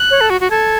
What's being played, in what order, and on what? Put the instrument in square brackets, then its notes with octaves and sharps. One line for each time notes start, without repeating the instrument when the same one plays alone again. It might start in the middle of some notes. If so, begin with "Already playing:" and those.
Already playing: [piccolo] F#6
[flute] C#5
A4
F#4
F#4
[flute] A4 [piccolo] G#6